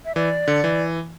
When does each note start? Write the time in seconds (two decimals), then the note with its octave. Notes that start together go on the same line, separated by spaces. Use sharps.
0.05 E5
0.15 E3 D5
0.48 D3
0.64 E3